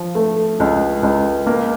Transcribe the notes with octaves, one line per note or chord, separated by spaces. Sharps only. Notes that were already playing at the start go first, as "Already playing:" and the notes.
Already playing: F3
A3
C#2
C#2
A#3